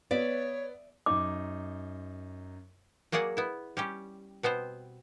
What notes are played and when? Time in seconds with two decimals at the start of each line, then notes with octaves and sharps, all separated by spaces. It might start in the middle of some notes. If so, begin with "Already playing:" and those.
0.11 B3 C#5 D5 E5
1.06 F#2 D#4 D6
3.12 F#3 A#3 G#4 D5 F#5
3.37 B3 E4
3.77 G3 C#4 G4
4.43 B2 B3 C4 C5